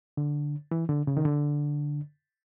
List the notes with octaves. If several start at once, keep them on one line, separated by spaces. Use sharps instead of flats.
D3
E3
D3
C#3
D#3
D3